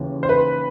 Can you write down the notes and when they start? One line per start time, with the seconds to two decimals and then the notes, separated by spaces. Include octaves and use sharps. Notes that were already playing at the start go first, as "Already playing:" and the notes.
Already playing: D#2 C#3 E3
0.23 C5
0.29 B4